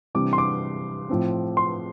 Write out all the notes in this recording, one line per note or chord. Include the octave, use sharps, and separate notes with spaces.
C3 E3 G3 D4 D6
C6
D6
A2 F3 C4
C6